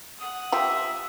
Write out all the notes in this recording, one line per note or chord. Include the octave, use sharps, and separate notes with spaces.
F#5 D#6
F4 G4 E5